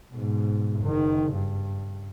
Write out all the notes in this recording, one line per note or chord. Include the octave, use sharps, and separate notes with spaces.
G#2 B2
F#1 D#3
G2